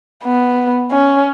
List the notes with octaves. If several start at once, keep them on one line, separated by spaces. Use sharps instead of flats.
B3
C#4